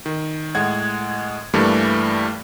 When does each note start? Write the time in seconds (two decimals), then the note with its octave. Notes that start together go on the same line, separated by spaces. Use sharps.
0.06 D#3
0.55 A2 G#3 F#5 G#6
1.54 G2 E3 G3 A3 A#3